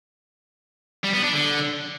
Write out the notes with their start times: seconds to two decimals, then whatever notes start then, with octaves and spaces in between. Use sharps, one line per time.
1.04 G3
1.14 B3
1.23 D4
1.33 D3